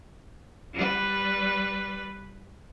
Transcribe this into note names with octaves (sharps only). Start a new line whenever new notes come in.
G3 B4